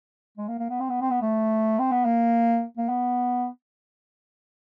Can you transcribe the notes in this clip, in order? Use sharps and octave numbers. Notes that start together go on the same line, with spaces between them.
G#3
A#3
A#3
B3
C4
B3
C4
B3
A3
C4
B3
A#3
A#3
B3